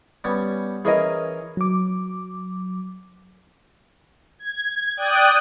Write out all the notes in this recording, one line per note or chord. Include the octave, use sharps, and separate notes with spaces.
G3 B3 C#4
E3 C#4 G#4 A#4 D#5
F#3 D6
G#6
D5 G5 D#6 F#6